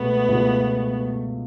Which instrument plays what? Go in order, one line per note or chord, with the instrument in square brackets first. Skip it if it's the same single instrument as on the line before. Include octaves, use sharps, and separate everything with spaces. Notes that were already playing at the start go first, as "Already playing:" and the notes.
Already playing: [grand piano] C#2 B2 G#3 C#4 [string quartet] A3 B3
[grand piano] C#2 B2 G#3 C#4 F4